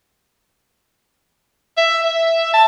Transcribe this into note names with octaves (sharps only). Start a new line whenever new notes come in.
E5
E5
A5